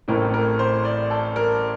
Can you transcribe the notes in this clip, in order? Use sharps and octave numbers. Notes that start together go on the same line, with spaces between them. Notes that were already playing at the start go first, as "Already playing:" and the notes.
A1 A2 E3 A3 C4 A#4
A#4
C5
D5
A4
A#4